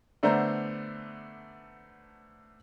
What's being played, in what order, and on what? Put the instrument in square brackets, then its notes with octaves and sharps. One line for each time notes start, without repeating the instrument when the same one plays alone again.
[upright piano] D3 A3 B3 D4 C5 A#5